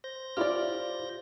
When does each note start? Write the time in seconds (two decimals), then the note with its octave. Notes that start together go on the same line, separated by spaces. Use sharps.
0.04 C5 G6 A#6
0.37 E4 F4 G4 D5 F6